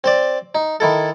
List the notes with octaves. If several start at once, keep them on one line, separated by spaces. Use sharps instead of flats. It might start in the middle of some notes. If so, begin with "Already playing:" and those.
C4 C5 D5
D#4
D#3 E4 A4